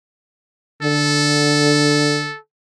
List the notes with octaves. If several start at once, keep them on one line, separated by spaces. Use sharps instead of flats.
D3 A4